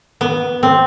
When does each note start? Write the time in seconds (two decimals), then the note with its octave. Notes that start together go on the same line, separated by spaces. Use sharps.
0.21 B3
0.63 C4